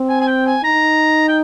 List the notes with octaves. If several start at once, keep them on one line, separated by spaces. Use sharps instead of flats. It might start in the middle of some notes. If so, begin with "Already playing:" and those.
Already playing: C4
G#5
G#5
G5
G#5
D#4 A#5
G5